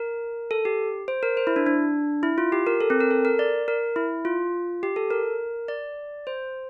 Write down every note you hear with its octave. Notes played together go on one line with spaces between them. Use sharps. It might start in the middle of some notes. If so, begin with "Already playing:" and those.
Already playing: A#4
A4
G4
C5
A#4
C5
E4
D4
D4
E4
F4
G4
A#4
A4
C4
A#4
A4
A#4
D5
A#4
E4
F4
G4
A4
A#4
D5
C5